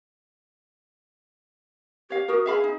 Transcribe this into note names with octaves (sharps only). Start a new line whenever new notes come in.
G4 C#5 F5
F#4 A#4 D#6
G#4 E5 F5 B5
D#4